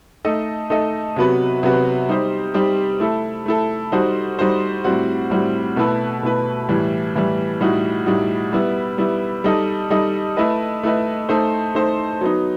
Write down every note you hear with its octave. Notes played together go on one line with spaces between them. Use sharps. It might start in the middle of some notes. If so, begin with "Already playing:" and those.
A3 D#4 A4 D#5
A3 D#4 A4 D#5
C3 F#3 B3 F#4 B4
C3 F#3 B3 F#4 B4
G3 D#4 G4 C5
G3 D#4 G4 C5
A3 E4 A4
A3 E4 A4
G3 D#4 F#4 C5
G3 D#4 F#4 C5
A2 G3 C4 F#4
A2 G3 C4 F#4
B2 A3 E4 B4
B2 A3 E4 B4
A2 E3 G3
A2 E3 G3
A2 G3 D#4 F#4
A2 G3 D#4 F#4
G3 B3 E4
G3 B3 E4
G3 D#4 A4 D#5
G3 D#4 A4 D#5
A3 E4 B4 D#5
A3 E4 B4 D#5
A3 D#4 A4 C5
A3 D#4 A4 C5
F#3 B3 D#4